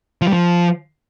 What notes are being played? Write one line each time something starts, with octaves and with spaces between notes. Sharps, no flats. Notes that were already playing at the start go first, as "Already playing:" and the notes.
F3
G3
F3